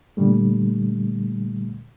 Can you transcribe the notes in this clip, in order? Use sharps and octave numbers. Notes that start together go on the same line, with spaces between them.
A#2 D3 G3 A3